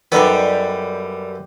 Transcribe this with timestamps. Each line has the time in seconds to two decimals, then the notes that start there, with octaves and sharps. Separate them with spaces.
0.12 F#2 G3 B3 D#4 G4 A4 B4